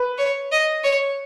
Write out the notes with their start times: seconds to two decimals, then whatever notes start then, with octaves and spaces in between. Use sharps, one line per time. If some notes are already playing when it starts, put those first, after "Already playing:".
Already playing: B4
0.18 C#5
0.52 D#5
0.84 C#5